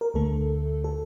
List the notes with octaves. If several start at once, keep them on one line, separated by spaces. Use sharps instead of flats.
A#4
D2 D3 A3 A4
A4